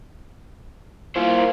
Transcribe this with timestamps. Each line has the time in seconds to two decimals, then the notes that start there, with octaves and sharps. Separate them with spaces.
1.16 A#3 E4 F4 C5